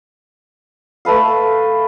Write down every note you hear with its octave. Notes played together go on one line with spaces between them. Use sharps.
A3 A4 B4 F5